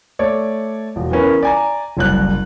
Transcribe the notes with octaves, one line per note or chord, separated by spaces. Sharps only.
A3 C#5 D5
E1
E3 B3 C#4 A#4
D5 G#5 A#5
F#1 C2 F#6